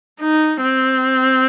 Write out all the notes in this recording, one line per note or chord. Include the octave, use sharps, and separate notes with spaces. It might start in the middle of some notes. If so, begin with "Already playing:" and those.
D#4
C4